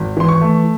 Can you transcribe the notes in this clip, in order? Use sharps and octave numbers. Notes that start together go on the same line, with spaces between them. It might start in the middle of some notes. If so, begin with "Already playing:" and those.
Already playing: G#1
E3 C6
C#6
A3